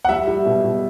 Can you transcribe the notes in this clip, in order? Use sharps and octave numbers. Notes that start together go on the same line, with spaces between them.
F#5
G3 E5
G3
B2
B2